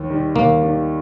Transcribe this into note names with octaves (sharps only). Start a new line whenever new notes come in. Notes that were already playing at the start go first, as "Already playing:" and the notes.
Already playing: D#2
D#3 G3
D#2 A#3
D#3 G3